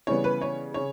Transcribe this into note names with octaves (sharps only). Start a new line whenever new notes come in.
C#3 E3 G3 B3 C#5
B4
C#5
C#3 C#5